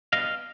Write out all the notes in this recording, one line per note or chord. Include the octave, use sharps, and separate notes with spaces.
B2 G3 B3 D4 D#5 F5